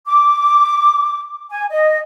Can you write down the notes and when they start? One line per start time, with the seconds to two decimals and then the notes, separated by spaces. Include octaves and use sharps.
0.07 D6
1.50 G#5
1.70 D#5